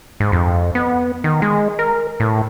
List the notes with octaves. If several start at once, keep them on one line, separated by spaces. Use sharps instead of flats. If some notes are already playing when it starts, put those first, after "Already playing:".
G#2
F2
B3
D#3
G#3
A#4
A2